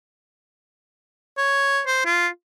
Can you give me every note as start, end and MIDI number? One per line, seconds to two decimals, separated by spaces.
1.38 1.81 73
1.86 2.01 72
2.05 2.28 65